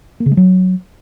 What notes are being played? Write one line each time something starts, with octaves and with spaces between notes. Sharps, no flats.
A#3
C#3
G#3
F#3